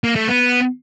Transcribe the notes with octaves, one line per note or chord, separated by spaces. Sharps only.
A#3
A3
B3